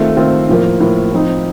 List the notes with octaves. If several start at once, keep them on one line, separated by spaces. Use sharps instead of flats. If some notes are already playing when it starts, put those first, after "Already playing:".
Already playing: D#3 A3 C4 F4
D#3 A3 C4 F4
A2 F3 A#3
A2 F3 A#3
F3 C4 D#4